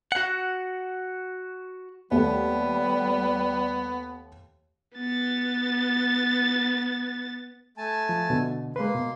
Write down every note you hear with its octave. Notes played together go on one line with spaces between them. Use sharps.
F#4 F#5
D#2 G3 A3 B3
B3 A6
A3 G#5 A5
F3
B2 D3
G#3 A#3 B4 C6
B2